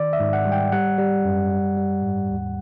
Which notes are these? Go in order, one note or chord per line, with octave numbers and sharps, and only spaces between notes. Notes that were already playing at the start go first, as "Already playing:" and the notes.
Already playing: D#3 D5
E5
G#2
F#5
G3
G5
G3 F#5
G3
F#2
G3
G3
G#2
D#2